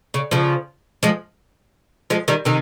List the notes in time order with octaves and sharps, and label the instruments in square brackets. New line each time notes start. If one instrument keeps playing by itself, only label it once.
[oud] C#3
C#3 F3
F3 G#3
F3 G#3
D#3 G3
C3 D#3